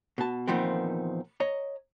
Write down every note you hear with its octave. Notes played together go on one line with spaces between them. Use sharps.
B2 A5
E2 A#2 D#3 F3 B3 C4
C#5 D#5 A#5